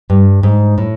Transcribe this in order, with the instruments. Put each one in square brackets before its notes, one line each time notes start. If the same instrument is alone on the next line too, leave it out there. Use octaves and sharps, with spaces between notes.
[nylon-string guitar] G2
G#2
A2